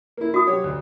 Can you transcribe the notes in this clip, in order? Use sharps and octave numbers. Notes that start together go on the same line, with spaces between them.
A#3 E4
F#4 D#6
F#3 G4 C#5
D2